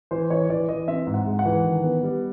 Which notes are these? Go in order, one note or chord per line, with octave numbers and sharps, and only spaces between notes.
E3 C5
E3 C#5
E3 D5
E3 D#5
C4 E5
G#2
F#5
G#3
F#5
E3
D#3
B3
G3